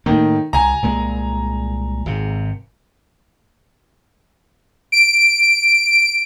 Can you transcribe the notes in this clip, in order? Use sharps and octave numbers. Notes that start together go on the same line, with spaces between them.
A2 D#3 A#3
C2 G#5 A#5
C2 A#2 G#3
G#1 C3
D7